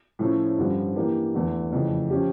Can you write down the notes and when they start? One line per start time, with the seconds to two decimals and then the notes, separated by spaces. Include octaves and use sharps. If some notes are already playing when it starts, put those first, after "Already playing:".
0.19 A2 F3 A3 C#4
0.58 G2 D3 F3 C#4
0.96 E3 A#3 D4 G4
1.34 E2 D3 A3
1.72 F2 C#3 E3 A3
2.10 F3 C#4 G4